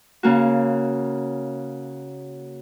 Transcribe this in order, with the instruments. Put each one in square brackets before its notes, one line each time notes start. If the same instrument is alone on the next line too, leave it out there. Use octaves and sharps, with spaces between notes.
[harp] C#3 A#3 F#4